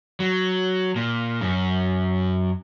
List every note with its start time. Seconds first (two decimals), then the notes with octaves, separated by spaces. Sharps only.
0.20 F#3
0.96 A#2
1.41 F#2